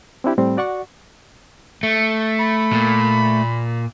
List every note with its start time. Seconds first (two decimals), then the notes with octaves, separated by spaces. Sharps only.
0.24 C4 D4 E4 G4
0.38 A2 G3 C4
0.57 F#4 D5 F#5 C#6
1.83 A3
2.39 B5
2.73 A#2